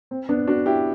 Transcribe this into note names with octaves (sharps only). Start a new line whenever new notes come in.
C4
B3 D4
D4 F#4
E4 G4